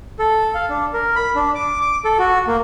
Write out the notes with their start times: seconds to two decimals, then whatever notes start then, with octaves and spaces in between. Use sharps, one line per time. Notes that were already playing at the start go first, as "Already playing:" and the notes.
0.19 A4
0.55 F5
0.69 D4
0.93 A#4
1.16 B5
1.36 D4
1.55 D6
1.81 D6
2.05 A4
2.19 F#4
2.47 A#3